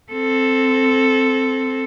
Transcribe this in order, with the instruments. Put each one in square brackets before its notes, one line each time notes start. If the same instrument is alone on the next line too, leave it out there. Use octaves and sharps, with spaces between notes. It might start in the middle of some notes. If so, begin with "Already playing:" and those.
[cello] C4 A4